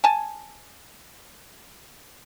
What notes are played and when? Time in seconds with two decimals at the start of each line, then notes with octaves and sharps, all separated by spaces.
0.04 G#5 A5